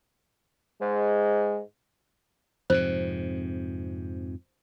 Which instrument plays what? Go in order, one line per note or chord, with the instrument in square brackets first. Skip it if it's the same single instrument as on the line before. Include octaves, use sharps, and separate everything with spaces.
[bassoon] G#2 [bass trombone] G#3
[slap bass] F2 G#2 C3 [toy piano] C5